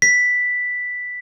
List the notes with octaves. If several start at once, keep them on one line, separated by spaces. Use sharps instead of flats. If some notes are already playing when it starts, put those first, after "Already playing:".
B6